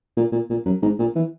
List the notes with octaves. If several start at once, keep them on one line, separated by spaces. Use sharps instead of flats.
A#2
A#2
A#2
F#2
G#2
A#2
E3